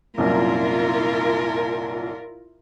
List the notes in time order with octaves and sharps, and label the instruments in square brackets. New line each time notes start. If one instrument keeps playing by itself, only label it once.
[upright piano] C2 F#2 A#2 [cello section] E4 F4 A#4